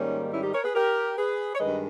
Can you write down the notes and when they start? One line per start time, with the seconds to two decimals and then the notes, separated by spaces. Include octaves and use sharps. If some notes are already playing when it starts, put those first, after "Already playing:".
Already playing: G#2 D#3 G3 A#3 C#4
0.33 C#4 E4
0.43 D#4 G4
0.54 A#4 C#5
0.64 G#4 B4
0.75 G4 A#4
1.18 G#4 B4
1.55 C#5
1.59 G2 D#3 G#3 B4 D#5